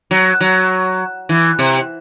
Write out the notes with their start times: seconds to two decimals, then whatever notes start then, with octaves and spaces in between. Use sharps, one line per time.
0.11 F#3
0.41 F#3
1.29 E3
1.59 C3